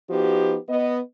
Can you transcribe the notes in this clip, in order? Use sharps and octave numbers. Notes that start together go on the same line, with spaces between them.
F3 B3 D#4 F#4 G4
B3 D#5